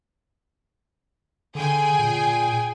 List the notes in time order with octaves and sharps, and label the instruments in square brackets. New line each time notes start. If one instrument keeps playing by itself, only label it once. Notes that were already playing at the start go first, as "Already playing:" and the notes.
[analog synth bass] D3 [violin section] G#4 G5 G#5
[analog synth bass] A#2